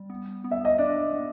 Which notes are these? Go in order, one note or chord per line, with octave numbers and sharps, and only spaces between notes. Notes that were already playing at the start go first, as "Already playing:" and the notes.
Already playing: G3
B3
B3
E5
D#5
D4 D5
B3